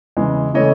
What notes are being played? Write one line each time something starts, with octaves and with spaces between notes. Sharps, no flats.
E2 C#3 E3 G#3
C#3 E3 A3 C#5 D#5